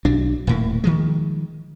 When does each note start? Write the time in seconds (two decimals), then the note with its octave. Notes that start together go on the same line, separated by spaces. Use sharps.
0.05 B1 F#3 D4
0.47 D#1 A2 A#3
0.84 D#3 F3 G#3